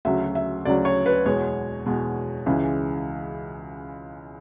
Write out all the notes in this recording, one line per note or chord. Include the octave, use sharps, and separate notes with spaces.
D2 C#3 F#3 E5
E5
D2 C#3 F#3 D5
C#5
B4
E2 B2 G#3 C#5
E2 B2 G#3
C#2 C#3 E3 G#3